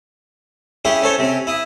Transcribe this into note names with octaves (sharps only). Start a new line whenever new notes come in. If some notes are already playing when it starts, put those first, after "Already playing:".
C#4 E4 G4 G#4
C#4 A4 C5 C#5
C3 C#4
E4 D#6